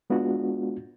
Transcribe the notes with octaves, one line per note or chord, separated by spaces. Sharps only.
G#3 B3 D4 F4 F#4